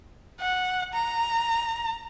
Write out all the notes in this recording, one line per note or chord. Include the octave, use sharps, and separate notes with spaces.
F#5
A#5